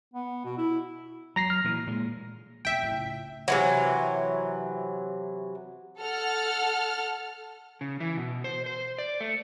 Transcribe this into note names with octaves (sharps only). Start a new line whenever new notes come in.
B3
B2
E4
F#3 A#5 A#6 C7
F6
A#2 E3
A#2 G#3
F1 B2 E5 G5
C#2 A2
C3 E3 F#3
A4 F#5 F6
C#3
E3
B2
C5
C5
D5
A3